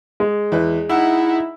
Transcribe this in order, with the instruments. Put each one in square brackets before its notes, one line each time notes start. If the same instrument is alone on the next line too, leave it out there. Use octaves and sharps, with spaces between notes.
[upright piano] G#3
[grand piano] E2 E4 B4
[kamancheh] D#4 F#5 [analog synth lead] E4 [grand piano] E6